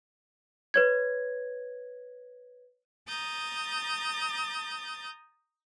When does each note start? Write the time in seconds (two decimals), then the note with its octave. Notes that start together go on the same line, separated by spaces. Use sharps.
0.74 B4 C#5 G#6
3.07 A#5 D#6 G6 A6